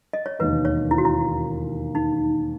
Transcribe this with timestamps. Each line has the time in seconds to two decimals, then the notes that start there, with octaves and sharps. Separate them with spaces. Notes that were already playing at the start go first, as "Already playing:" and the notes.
0.13 D#5
0.26 C#5
0.39 E1 D#2 D#3 B4
0.65 C#5
0.91 E4
0.98 F#4
1.05 E4
1.95 D#4